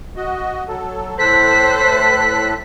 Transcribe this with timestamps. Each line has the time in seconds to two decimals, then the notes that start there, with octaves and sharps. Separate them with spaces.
0.16 F#4 D#5
0.68 F#3 A4
1.18 A2 A4 C5 F#6 B6